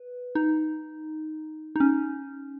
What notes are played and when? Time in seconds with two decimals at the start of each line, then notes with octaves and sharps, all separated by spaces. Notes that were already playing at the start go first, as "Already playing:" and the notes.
Already playing: B4
0.35 D#4
1.76 D#4
1.80 C#4